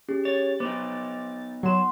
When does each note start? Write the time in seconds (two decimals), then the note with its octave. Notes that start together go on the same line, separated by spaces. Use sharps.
0.08 C#4 G4 G#4
0.25 C#5 A6
0.60 B3 D#4 C5 D6
1.63 F#3 F#5 C6 E7